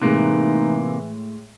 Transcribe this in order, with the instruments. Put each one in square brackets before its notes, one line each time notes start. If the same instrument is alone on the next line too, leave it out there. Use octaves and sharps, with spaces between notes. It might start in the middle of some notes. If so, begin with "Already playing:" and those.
[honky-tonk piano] A2 G#3 F#6 [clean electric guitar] C3 A#3 [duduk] E3 [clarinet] D#4